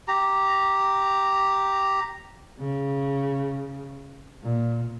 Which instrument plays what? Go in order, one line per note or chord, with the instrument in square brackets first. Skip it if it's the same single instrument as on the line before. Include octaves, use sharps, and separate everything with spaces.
[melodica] G4 A#5
[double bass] C#3
A#2